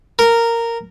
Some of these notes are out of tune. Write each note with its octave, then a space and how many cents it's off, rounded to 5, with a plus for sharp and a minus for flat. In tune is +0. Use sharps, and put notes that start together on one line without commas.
A#4 -10